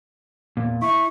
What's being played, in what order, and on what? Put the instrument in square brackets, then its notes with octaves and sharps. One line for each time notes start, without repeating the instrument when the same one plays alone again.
[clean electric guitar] E2 A#2
[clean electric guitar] E4 [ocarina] C#6